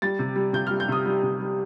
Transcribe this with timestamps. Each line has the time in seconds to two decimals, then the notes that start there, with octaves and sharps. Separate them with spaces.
0.02 G3 A6
0.19 C3
0.36 G3
0.53 C3 G6
0.67 G3 F6
0.80 G6
0.88 C3 D#6
1.06 G3
1.23 C3
1.40 G3